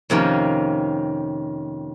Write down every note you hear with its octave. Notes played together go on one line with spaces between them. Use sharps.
F2 C3 D#3 A#3 C#4